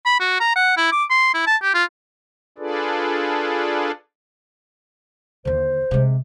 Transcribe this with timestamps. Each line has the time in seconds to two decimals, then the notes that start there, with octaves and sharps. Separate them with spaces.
0.06 B5
0.20 F#4
0.40 A#5
0.56 F#5
0.77 E4
0.92 D6
1.10 C6
1.34 E4
1.47 A5
1.62 G4
1.75 F4
2.58 D4 F4 G#4 A4 B4 D5
5.45 D#2 D3 C5
5.91 C3 G#3